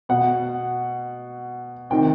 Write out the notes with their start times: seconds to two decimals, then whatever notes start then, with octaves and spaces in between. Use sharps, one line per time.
0.09 B2 F#5
1.90 C3 D#3 G5